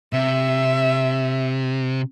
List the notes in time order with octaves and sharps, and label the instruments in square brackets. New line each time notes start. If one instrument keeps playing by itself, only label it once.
[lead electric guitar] C3 [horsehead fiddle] E5